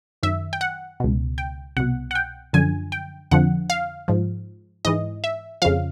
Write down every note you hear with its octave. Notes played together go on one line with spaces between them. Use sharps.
F#2 D#3 E5
G5
F#5
C#2 B2
G5
C2 B2 F#5
F#5
G5
F#2 D3 F3 G#5
G5
F2 D3 F3 F#5
F5
G#2 F3
G#2 E3 D#5
E5
F2 C#3 F3 F5